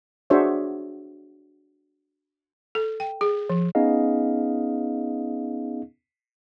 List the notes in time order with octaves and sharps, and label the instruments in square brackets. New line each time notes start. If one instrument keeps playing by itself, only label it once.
[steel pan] D4 F#4 G#4 C5 C#5 E5
[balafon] A4
G5
G#4
F3
[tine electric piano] B3 C#4 D#4 G#4 D#5 F5